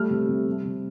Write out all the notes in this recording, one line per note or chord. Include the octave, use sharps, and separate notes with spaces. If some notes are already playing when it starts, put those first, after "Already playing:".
Already playing: G3 A3 F6
C3
C3
G3
C3